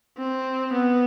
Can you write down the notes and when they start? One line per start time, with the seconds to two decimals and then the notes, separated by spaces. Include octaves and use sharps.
0.18 C4
0.72 B3